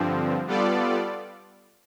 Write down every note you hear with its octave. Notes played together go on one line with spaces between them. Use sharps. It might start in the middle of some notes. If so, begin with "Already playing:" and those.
Already playing: G2 D3 F3 C4
G3 B3 F4 A4 D5